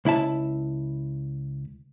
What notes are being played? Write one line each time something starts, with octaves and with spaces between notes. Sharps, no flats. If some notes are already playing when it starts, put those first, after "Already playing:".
C#2 E4 E5 A5